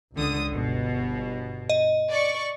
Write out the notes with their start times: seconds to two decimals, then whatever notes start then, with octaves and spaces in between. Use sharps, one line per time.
0.15 C#2 D3 D#6
0.51 G1 B2
1.69 D#5
2.10 D5 C#6